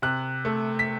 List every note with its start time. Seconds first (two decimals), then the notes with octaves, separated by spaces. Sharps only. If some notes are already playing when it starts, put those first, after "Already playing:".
0.02 C3 F#6
0.45 A3
0.79 B6